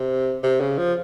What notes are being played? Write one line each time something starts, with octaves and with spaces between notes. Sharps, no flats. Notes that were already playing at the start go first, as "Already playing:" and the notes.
Already playing: C3
C3
C#3
F3